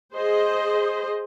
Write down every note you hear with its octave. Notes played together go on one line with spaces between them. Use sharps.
G#4 C5 D#5